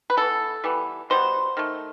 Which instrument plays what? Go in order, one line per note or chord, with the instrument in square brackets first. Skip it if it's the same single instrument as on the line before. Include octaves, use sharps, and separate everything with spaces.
[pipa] B4
E3 B3 A4
E3 G3 B3
B2 G3 B3 C5
D#3 A3